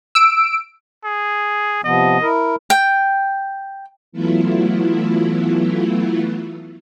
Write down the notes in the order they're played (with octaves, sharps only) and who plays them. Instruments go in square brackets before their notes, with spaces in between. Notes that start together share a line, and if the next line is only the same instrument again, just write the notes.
[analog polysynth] E6 D7
[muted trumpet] G#4
[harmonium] C3 F3 B3 [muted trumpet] D#5
[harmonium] E4 A#4
[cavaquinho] G5
[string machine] E3 F#3 A3 B3 E4 F4